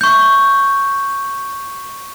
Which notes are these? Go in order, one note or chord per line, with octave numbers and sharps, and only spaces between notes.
C#6 G6